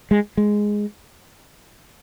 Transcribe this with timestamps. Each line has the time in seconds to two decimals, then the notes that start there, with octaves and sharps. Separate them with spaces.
0.11 G#3
0.37 G#3